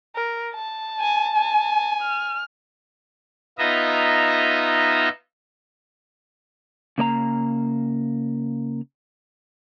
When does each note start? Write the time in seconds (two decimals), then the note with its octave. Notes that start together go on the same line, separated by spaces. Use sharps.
0.15 A#4
0.55 A5
1.01 G#5
1.37 G#5
2.02 F6
3.58 B3 D#4 F4 D#5 E5 A#5
6.98 C#3 A#3 D5 A#5